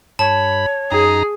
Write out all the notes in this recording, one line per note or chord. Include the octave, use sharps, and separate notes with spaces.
G2 C#5 A5 B5
F#2 D#4 G#4 A#5